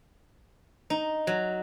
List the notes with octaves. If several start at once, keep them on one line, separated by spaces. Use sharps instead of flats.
D#4
F#3